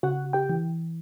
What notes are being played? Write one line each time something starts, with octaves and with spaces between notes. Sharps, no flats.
C#3 F#4 F#5
G4 G5
E3